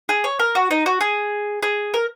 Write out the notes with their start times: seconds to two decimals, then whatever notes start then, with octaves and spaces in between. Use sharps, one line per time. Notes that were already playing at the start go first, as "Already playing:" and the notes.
0.09 G#4
0.24 C#5
0.39 A#4
0.55 F#4
0.71 D#4
0.86 F#4
1.01 G#4
1.63 G#4
1.94 A#4